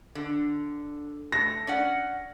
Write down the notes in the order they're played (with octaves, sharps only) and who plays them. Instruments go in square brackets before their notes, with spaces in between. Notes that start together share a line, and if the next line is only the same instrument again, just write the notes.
[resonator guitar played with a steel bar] D3
[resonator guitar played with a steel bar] A3 [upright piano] A#6
[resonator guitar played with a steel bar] C#4 D5 F#5